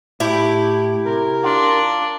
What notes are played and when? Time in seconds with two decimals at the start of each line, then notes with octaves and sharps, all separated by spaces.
0.20 A2 E4 G4
1.06 C3 A#4
1.44 D4 F4